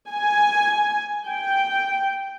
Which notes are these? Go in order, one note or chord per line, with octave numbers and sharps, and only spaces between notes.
G#5
G5